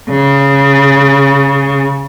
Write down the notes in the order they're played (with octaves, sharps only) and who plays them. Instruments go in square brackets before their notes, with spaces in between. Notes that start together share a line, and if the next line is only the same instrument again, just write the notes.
[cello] C#3